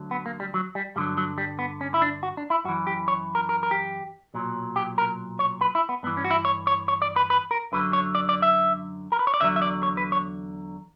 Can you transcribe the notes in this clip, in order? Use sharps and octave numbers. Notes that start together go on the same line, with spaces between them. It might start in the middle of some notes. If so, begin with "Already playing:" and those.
Already playing: D2 D3 F#3
B3
A#3
G3
F#3
G3
G2 D3 F#3 G3
F#3
G3
B3
C#4
E4
D4
F#4
D4
E4
F#2 E3 F#4
G4
C#5
A#4
A#4
A#4
G4
B1 A#2 F#3
G4
A#4
C#5
B4
E4
B3
G2 E3 B3
C#4
F#4
E4
C#5
C#5
C#5
D5
B4
B4
A#4
F#2 D3 F#3 B4
C#5
D5
D5
E5
A#4
B4
C#5
D5
E2 D3 F#3 E5
E5
D5
C#5
B4
C#5